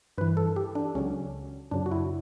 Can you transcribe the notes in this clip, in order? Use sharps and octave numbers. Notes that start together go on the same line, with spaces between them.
G2 E3 B4
A4
G4
D4
C#2 C#3 F#3 C#4
F#2 C#3 F#3 D4
F#4
E4